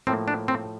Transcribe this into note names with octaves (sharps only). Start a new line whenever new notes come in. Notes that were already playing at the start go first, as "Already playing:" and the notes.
A2 F3 A#3 C4
D4
C4